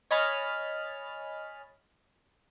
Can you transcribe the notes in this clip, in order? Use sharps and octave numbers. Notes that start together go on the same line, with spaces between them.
C#5 D#5 G#5 B5 F6 A6